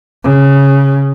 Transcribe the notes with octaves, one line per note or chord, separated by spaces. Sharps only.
C#3